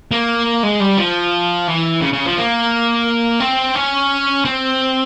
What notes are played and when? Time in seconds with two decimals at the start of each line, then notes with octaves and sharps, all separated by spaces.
0.11 A#3
0.63 G#3
0.80 G3
0.98 F3
1.68 E3
2.02 C#3
2.13 C#3
2.26 F3
2.37 A#3
3.40 C4
3.76 C#4
4.45 C4